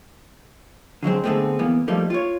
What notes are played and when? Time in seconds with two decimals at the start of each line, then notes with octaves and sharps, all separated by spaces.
1.03 D3 F#3 G#3 C4
1.24 D3 G#3 A3 B3 C4
1.59 G#2 E3 A#3 B3
1.88 F3 G3 A3 A#3 D#4
2.10 F4 C#5